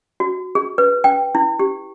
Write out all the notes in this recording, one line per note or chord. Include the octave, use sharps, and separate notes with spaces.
F#4
G#4
B4
G5
E4
G4